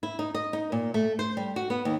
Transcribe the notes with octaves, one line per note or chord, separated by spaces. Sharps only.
E4
D#4
D#5
D#4
A#2
A3
C5
G3
F#4
B3
D#2